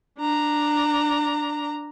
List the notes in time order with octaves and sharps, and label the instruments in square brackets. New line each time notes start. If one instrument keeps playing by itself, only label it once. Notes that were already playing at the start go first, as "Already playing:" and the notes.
[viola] D4 A#5